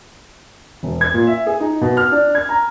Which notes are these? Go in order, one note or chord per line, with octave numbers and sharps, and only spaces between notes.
E1
G#6
A#2
E5
G#4
D#4
B2
F6
D4
G#6
A#5